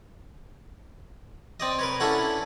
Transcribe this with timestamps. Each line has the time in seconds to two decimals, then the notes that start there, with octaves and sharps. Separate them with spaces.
1.60 C4 D5 D#5
1.79 A#4 B4 C#5
2.00 C#4 D4 E4 A4 C#5 F#5